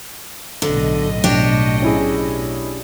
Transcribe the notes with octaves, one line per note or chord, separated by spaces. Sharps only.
B1 A2 D3 D#5
D4 G4 C#5
C#4 E4 G#4